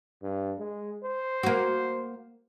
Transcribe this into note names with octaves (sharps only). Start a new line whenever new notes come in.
G2
G#3
C5
A#3 F#4